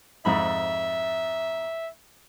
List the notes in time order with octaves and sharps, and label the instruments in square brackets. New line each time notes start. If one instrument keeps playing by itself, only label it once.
[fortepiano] F2 G#2 B5 [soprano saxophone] E5